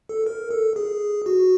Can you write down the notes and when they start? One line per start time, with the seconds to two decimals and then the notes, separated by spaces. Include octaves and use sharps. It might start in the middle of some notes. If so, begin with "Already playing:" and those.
0.09 A4
0.27 A#4
0.51 A4
0.76 G#4
1.26 F#4